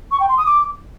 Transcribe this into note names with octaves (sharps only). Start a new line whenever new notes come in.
C#6
G5
C6
D#6
D6